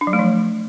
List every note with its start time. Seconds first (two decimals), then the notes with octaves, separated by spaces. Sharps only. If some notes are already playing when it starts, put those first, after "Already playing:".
0.01 D4
0.07 F#3
0.13 A3
0.19 F3